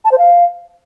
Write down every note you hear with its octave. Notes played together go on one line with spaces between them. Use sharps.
A5
C5
F5